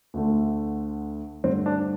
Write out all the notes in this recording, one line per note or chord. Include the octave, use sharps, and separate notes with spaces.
D2 D3 A3
G2 D3 A3 C4
D4